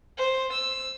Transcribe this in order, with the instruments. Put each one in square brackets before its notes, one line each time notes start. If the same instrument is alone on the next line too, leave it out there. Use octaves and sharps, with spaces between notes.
[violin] C5
E6